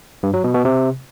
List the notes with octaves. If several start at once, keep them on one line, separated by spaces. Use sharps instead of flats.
G2
F#3
B2
B2
C3